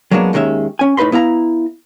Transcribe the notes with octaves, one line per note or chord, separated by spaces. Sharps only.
F#3 G#3 A#3 B3 D4
D#2 D#3 G#3 C#4 E5
C#4 G#5
A2 D#4 B4 B5 C6
B3 E4 F5 A#5